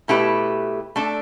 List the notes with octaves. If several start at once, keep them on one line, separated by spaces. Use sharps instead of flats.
B2 A3 E4 G4 B4
A3 D4 A4